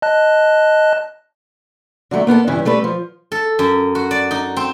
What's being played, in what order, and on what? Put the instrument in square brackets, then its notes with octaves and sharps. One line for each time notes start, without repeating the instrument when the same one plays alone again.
[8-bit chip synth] D#5 A5 F#6
[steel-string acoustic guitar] D3 F#3 G#3 A3
A#3 B3 F4 A4
G2 C#3 E3
G3 A3 A4 B4
F3
[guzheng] A4
F#2
F#4
D5
D#4
C4